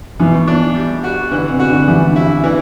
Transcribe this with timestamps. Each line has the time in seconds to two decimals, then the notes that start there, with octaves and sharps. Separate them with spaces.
0.19 B2 E3
0.47 D4
0.76 G3
1.04 F#4
1.31 D3 E3
1.50 C3
1.60 F#4
1.69 D3
1.88 E3 G3
2.16 E4
2.43 D3 E3